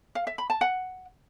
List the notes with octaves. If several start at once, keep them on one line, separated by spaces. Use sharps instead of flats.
F5
E5
B5
A5
F#5